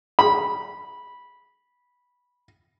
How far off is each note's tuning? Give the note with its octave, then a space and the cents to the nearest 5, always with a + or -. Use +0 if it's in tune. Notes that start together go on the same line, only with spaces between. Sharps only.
B5 -10